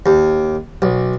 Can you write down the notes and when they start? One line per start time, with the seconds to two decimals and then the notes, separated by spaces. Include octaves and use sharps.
0.06 D#2
0.82 B1